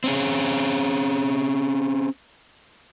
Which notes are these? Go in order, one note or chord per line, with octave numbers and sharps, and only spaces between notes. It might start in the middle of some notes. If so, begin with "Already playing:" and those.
C4 C#4 G#4